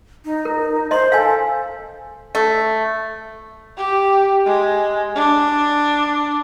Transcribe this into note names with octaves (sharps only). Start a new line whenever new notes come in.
D#4
A#4
C5 D#5 C6
A4 F5 G#5
A3
G4
G#3
D4